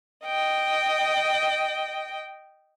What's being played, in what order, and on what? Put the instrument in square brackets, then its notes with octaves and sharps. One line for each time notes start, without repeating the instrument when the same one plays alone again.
[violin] D#5 G5